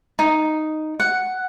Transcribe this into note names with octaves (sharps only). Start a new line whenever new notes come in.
D#4
F#5